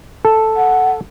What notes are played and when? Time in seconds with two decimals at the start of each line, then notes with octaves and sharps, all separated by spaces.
0.25 A4
0.57 F#5